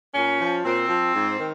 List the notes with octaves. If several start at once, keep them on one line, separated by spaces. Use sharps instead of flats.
A#2 C#4
F3
A#2 C4
F3
G#2
D#3